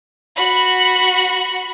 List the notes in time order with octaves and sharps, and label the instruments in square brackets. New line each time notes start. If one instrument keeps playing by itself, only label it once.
[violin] F#4 B5